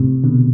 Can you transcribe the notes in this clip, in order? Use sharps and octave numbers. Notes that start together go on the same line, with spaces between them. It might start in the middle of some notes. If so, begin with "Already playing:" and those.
Already playing: A2 C3
B2 D3